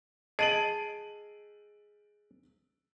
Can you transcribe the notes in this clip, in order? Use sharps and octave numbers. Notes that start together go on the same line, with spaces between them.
G#4 D#5 A5 D7 D#7 F#7